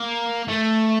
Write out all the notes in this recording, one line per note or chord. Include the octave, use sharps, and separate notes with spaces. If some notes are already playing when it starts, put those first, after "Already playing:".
Already playing: A#3
A3